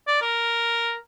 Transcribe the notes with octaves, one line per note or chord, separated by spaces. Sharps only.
D5
A#4